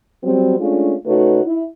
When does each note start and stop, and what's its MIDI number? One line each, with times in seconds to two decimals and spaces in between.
0.24 0.57 54
0.24 0.57 55
0.24 0.57 60
0.59 0.94 56
0.59 0.94 57
0.59 0.94 61
0.59 0.94 62
0.59 0.94 65
1.06 1.41 49
1.06 1.41 57
1.06 1.41 63
1.06 1.41 66
1.06 1.41 71
1.06 1.41 73
1.44 1.63 64